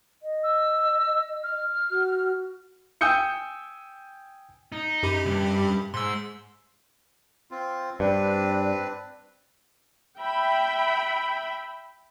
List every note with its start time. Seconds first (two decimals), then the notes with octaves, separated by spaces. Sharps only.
0.23 D#5
0.43 E6
1.43 F6
1.91 F#4
3.01 G5 G#5 D#6 E6 G6 C#7
4.72 D#4
5.03 F#2 G4 B5
5.25 C#2 G2
5.94 G#2 C6 E6
7.51 C4 F4
8.00 G2 C4 D4 B4 D5
10.19 E5 G5 B5